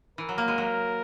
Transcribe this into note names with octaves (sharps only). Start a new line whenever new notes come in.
E3 A#4
F#3
A#3
G#3
F#3